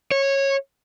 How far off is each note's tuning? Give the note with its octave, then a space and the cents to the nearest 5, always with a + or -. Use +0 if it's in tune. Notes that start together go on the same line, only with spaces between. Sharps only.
C#5 -15